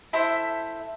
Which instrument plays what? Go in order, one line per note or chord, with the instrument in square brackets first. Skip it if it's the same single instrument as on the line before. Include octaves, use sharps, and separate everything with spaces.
[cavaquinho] E4 A4 C5 E5